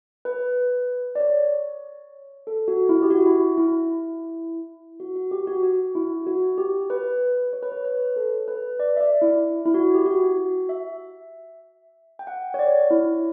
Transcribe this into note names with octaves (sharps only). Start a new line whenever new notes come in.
B4
D5
C#5
A4
F#4
E4
G4
F#4
E4
E4
F#4
F#4
G4
F#4
F#4
E4
F#4
G4
B4
C#5
B4
C#5
B4
A4
B4
D5
E5
D5
E4
E4
F#4
G4
F#4
F#4
E5
G5
F#5
C#5
D5
E4